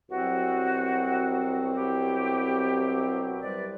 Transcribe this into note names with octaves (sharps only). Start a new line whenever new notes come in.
C2 B2 F#3 C4 F#4
E4 G4
C2 C3 G3 B4 D5